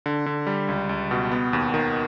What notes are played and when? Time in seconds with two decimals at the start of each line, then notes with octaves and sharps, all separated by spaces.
0.06 D3
0.26 D3
0.47 G3
0.69 C#2
0.89 C#2
1.11 B2
1.31 B3
1.53 D#2
1.74 D#3